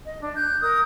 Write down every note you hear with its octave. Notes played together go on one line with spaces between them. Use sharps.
D#5
D4
F#6 G6
A#4 D#6 G6